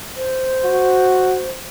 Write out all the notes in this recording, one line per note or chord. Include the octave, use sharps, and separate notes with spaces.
C5
F#4